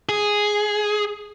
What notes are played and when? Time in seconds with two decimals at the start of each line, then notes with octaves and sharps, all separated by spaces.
0.09 G#4